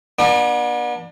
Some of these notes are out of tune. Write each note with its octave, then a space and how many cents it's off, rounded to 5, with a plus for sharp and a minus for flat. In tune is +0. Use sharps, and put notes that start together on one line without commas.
B3 -40 D4 +25